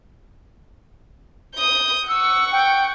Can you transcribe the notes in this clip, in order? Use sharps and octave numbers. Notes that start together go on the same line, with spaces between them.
D#6 G6
F#5 C#6 E6
G5